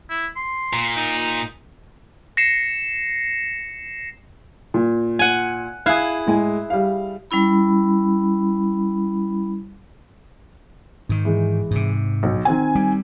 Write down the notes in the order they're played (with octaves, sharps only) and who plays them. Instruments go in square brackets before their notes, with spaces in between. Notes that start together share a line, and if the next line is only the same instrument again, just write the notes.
[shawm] E4
C6
[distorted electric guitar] A#2
[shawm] D#4
[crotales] A#6 C7 C#7 E7
[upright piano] A#2
[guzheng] F#5 G#5
[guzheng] E4 G#4 [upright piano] F5 F#6 C7
[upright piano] A2 G#3 G#5
G3 F5
[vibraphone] G3 C#4 E4 B5
[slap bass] G#2 D#3
[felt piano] E3 G#3
[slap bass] G#2 C3
[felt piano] B1
D#3 C4 G#5
[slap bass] G3